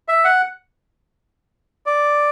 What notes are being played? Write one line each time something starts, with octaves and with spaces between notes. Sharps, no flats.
E5
F#5
D5